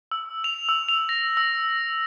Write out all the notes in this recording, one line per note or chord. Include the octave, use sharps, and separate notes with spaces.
E6
F7
E6
F7
A#6
E6